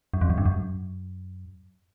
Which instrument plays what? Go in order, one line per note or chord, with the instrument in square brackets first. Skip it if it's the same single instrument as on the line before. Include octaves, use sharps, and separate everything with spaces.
[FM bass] F#2
F2
F#2
G2
F#2